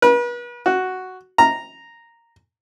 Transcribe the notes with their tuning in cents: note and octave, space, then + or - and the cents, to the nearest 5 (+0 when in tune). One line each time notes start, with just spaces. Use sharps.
B4 -40
F#4 +5
A#5 -5